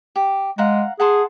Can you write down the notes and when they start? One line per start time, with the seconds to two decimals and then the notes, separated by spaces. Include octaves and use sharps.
0.16 G4
0.58 G#3 F5 F#5 A#5
1.00 G#4 F#5 A5 C6